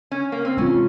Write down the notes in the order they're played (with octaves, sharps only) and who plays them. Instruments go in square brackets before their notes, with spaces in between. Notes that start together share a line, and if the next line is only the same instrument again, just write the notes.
[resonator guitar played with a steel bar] C#4
A#3
C4
[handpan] C3 E3 G#3 C4 F4 [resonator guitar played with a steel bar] C#4